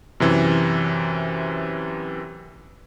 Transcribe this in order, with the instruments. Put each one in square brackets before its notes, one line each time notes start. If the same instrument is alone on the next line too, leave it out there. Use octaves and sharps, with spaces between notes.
[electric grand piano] F#2 C3 E3